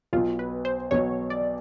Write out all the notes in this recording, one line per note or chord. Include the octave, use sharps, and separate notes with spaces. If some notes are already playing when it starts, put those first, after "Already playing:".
B1 B2 F#3 F4
B4
C5
B1 B2 F#3 C#5
D5